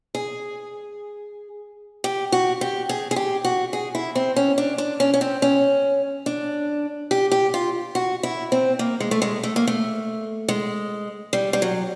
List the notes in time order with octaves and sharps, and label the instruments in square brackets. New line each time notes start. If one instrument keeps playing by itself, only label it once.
[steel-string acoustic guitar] G#4
G4
F#4
G4
G#4
G#4
G4
F#4
G#4
E4
C4
C#4
D4
D4
C#4
C#4
C4
C#4
D4
G4
G4
F4
F#4
E4
C4
A#3
G#3
A3
G#3
A3
A#3
A3
G#3
G3
G3
F#3